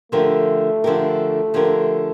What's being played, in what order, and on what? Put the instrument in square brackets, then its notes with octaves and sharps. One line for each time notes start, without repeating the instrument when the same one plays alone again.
[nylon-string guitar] D3 F3 C#4 G4 A#4 [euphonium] A3
[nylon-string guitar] D3 F3 C#4 G4 A#4
D3 F3 C#4 G4 A#4